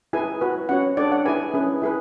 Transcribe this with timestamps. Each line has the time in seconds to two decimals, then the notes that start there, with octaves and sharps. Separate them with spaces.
0.13 E4 G#4 B4 G#5
0.41 F#4 B4
0.69 C#4 F#4 C#5 F#5
0.97 D4 A4 C#5 D5
1.12 F#5
1.25 E4 G#4 B4 G#5
1.54 C#4 E4 G#4 B4
1.82 E4 G#4 B4